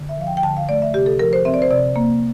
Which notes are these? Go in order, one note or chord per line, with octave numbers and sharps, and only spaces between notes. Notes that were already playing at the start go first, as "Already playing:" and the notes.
Already playing: D3
E5
F3 F5
G5
G5
D3 A5
F5
A3 D5
E5
C3 G4
A4
F3 A#4
C5
C4 E5
D5
C5
C3 D5
A#3